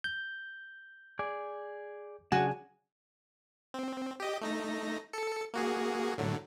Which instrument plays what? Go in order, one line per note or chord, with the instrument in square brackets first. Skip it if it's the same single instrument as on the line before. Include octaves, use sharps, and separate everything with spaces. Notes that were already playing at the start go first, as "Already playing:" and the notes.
[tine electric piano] G6
[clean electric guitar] G#4 D5
[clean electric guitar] C#3 D4 [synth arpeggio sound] F#3 G#4 [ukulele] F#4 [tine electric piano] G#5
[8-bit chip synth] C4
G4 D#5
A3 D#4 A#6
A4 C#7
A#3 F#4 G#4
A2 D3 F#3